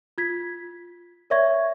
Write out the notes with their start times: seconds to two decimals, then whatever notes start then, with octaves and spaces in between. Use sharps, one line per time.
0.18 F4 G#6 B6
1.30 A#4 C#5 D5 E5 C#6 G#6